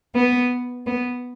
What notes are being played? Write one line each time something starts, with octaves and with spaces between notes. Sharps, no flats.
B3
B3